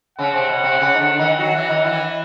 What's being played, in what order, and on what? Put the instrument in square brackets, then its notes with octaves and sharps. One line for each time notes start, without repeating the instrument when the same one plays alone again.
[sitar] C#3 C#4 [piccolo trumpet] F#5
[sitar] C3 C4
B2 B3
C3 C4
C#3 C#4
D#4
D3 D4
D#3 D#4
[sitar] F#3 F#4 [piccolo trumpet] F#5
[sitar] E3 E4
D#3 D#4
E3 E4